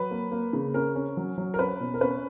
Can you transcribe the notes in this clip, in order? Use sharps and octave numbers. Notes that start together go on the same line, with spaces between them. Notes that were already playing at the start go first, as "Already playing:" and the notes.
Already playing: F#3 B4
A#3
A#3
C#3
C#4 A#4
C#4
F#3
F#3
A#4
C#4 B4
B2
A#4
C#4 B4